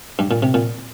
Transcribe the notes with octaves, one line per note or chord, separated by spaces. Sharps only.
G2
A#2
C3
A#2